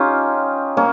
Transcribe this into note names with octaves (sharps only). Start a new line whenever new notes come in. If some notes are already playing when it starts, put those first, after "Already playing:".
Already playing: C#4 D#4 F4 G4
A#3 C#4